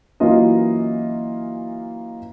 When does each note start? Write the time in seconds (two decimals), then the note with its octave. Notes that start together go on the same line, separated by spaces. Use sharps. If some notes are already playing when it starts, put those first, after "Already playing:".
0.20 E3 F#3 A#3 C#4 F4 D#5